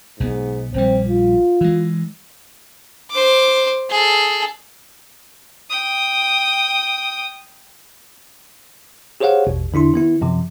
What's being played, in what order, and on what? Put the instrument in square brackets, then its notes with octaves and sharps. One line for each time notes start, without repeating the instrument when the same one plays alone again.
[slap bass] B1 E3 B3 [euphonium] G#2
[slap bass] A#1 G3 [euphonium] C4
[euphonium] F4
[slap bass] E3 G#3
[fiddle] C5 D6
G#4 A4
[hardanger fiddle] G5 D#6
[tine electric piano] G4 G#4 C5 C#5 F5 F#5
A1 E2 B2
E2 D3 D4 E4 C6
D#3 B3 E4
F#2 C3 F3